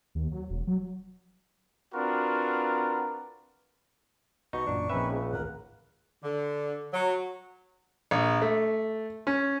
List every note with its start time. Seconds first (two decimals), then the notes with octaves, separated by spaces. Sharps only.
0.15 D#2
0.32 F#3
0.50 E1
0.67 F#3
1.95 C4 D4 F4 F#4 A#4 B4
4.53 C2 B2 D#4 C#6
4.66 A1 F#2 A#2 D4
4.89 A#1 C4 C#4 D#4 B4 E5
5.11 C#2
5.33 G#1 D2 A#4 F#5
6.24 D3
6.94 F#3
8.11 A#1
8.42 A3
9.27 C#4